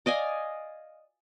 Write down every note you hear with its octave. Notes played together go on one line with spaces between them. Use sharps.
D5 D#5 F5 G#5